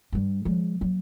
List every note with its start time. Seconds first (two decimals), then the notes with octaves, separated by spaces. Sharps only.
0.12 G2 G3
0.45 F3 G#3
0.81 F#3 A#3